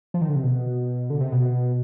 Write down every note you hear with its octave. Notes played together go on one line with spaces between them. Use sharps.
F3
D#3
D3
C3
B2
D3
C3
B2